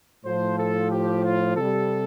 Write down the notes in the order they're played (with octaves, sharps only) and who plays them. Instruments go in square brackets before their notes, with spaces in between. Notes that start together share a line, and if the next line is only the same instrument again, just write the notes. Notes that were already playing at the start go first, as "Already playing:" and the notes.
[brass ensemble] A2 F3 C5
A4
G4
F4
C3 G3 A4